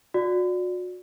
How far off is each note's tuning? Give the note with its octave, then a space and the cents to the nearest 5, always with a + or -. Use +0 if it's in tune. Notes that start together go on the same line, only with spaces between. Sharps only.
F#4 -35 D5 +0